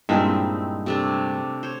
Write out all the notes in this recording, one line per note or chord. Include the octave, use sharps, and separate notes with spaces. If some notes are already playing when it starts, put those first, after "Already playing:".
G2 A#2 G#3 C4 D#4 E4
C3 A3 D4
C5 C#5